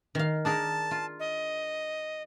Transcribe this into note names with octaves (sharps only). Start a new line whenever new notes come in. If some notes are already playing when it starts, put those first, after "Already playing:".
D#3 F5
D4 G#4 A#4 A5
F4
D#5